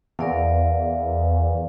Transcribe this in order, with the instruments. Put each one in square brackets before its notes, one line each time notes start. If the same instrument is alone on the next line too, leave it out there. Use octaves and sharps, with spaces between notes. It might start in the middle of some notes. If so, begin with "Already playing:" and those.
[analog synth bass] E2 [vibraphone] A#4 D5 F5